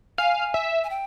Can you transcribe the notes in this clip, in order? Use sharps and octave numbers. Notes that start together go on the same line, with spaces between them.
F5 G#5
E5
G#5
G5